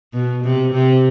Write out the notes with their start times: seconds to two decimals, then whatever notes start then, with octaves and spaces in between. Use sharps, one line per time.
0.14 B2
0.44 C3
0.73 C3